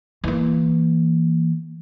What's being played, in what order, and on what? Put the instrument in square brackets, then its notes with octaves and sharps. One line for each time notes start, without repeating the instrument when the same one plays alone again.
[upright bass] E3 A#3